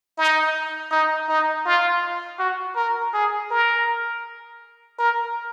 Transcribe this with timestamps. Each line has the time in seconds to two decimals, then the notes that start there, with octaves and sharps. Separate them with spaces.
0.18 D#4
0.91 D#4
1.29 D#4
1.65 F4
2.39 F#4
2.76 A#4
3.14 G#4
3.51 A#4
4.98 A#4